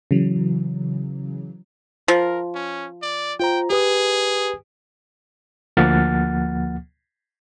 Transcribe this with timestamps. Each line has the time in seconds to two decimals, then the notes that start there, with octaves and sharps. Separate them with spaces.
0.11 C#3 E3 F#3
2.08 F3 A#4
2.55 C#4
3.02 D5
3.40 F4 C5 G5 A#5
3.70 G4 G#4 B4 D#6
5.77 D2 F3 A#3 F#5 F6 A6